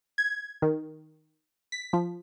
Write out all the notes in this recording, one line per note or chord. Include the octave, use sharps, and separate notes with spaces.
G#6
D#3
B6
F3